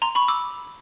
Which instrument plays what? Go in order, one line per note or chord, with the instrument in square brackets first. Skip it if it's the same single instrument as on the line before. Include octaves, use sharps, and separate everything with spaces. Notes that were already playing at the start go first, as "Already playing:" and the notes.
[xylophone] A#5 C6
B5 C#6
D6 E6